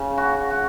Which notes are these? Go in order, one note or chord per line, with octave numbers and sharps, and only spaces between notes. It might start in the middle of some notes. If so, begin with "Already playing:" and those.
Already playing: C#3
F#4
F#4